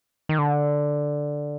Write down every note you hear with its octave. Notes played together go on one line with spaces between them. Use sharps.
D#3
D3